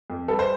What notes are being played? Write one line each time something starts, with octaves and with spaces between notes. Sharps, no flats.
F2
G3 A4
C5